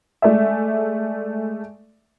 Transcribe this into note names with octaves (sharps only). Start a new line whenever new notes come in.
G#3 A3 D5 E5